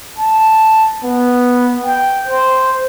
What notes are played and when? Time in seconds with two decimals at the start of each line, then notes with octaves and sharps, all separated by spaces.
0.18 A5
1.03 B3
1.86 G5
2.28 C5